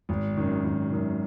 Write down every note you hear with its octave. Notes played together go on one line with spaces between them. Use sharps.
G#1
F#2 D#3
G#1
F#2 D#3